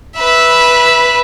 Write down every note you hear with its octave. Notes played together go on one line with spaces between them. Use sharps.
B4 E5